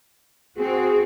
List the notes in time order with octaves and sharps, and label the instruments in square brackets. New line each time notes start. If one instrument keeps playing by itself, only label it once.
[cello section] C4 F#4 [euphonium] G#4